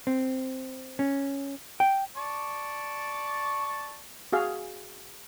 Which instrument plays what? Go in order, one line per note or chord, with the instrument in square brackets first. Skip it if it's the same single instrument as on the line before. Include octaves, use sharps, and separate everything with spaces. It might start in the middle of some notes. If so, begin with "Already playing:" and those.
[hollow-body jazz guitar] C4
C#4
G5
[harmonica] D5 A5 C#6
[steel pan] F#4 G#4 F5